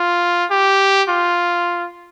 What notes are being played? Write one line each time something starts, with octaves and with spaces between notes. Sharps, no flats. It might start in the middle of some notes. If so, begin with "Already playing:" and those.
Already playing: F4
G4
F4